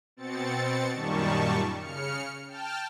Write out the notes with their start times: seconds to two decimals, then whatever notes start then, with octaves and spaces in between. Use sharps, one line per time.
0.17 B2 C4 A6 C#7
0.93 F#2 A#2 D#3 G3 A5 C#6
1.76 C#3 F6 C#7
2.48 G5 A5 F6